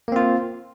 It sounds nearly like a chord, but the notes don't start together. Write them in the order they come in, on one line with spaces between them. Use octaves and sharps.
A#3 C4 F4